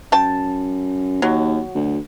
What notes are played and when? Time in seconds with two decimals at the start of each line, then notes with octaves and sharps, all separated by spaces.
0.12 F#2 G5 A5
1.22 D#2 F#3
1.75 D2